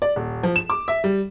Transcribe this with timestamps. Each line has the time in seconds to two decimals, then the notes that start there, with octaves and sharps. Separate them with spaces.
0.02 D5
0.16 D#1
0.43 F3
0.56 E7
0.70 D6
0.88 E5
1.04 G3